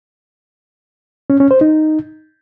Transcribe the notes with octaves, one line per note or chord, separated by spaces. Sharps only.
C#4
C#4
C5
D#4